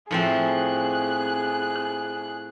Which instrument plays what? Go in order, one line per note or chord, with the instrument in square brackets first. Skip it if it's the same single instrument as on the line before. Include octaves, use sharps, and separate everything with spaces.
[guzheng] A2 F3 C4 [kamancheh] G#4 F#6